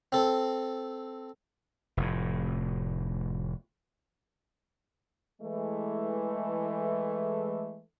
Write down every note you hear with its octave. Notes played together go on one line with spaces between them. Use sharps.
C4 A4
F1 A2
E3 G#3 A3